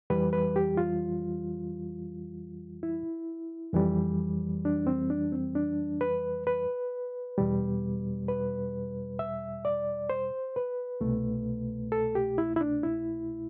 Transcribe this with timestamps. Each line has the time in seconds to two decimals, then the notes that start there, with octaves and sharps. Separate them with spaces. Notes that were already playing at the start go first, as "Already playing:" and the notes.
0.10 F2 E3 G3 B4
0.33 B4
0.56 G4
0.77 F4
2.83 E4
3.73 F2 E3 G3
4.65 D4
4.87 C4
5.10 D4
5.32 C4
5.55 D4
6.01 B4
6.47 B4
7.38 E2 B2 G3
8.28 B4
9.19 E5
9.65 D5
10.10 C5
10.56 B4
11.01 C2 B2 A3
11.92 A4
12.15 G4
12.38 E4
12.56 E4
12.61 D4
12.83 E4